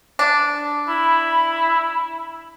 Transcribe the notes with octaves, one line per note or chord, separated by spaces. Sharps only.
D4
E4 B5